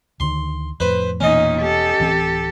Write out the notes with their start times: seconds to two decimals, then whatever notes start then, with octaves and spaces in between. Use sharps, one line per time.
0.20 D2 D3 D#3 C6
0.80 F2 A2 B4 C5
1.20 E1 A#2 E3 B3 C#4 D#4 D#5
1.61 G4 A4
2.00 D1 E3 C4